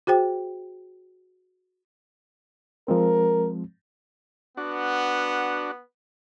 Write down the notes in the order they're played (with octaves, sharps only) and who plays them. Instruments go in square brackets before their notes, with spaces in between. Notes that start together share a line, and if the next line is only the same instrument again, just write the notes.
[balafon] F#4 G#4 C5 G5
[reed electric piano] F3 G#3 C4 [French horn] A#4
[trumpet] B3 [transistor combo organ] D4 F#4